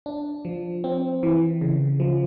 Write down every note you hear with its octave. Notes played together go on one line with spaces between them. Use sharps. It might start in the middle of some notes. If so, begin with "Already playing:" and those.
D4
F3
C4
E3
C#3
F3